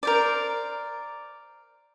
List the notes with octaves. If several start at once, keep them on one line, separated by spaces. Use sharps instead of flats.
A#4 C5 D5